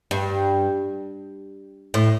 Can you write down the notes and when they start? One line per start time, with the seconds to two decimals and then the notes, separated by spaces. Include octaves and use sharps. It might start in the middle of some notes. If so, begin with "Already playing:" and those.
0.11 G2
1.94 A2